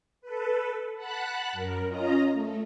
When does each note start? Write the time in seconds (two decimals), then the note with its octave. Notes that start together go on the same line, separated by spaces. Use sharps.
0.21 A4 B4
0.96 F#5 A5 B5 F#6
1.52 F#2 A#4
1.87 C#4 F4 D#5 A#5
2.32 A3